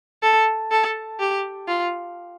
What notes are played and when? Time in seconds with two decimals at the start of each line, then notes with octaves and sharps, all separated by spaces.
0.22 A4
0.71 A4
1.20 G4
1.68 F4